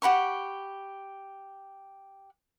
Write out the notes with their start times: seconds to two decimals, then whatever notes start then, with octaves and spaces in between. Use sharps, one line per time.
0.02 G4 F#5 B5 C#6